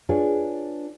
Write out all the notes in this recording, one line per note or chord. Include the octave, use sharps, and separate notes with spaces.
D4 F4 G#4 B4 C#5